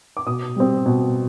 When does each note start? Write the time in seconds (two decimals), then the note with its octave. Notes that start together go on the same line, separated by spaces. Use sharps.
0.17 D6
0.26 B2 D#6
0.56 G3 C4
0.86 B2